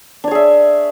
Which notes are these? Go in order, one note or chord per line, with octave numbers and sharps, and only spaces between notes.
D4 G#4 C#5 E5